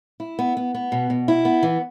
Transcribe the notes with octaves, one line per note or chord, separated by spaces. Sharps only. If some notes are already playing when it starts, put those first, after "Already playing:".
E4
B3
B3
B3
B2
B2
E4
B3
E3